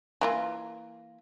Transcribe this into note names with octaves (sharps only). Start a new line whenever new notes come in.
E3 A#3 F4